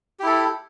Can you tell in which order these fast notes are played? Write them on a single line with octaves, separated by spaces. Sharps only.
G4 E4 A4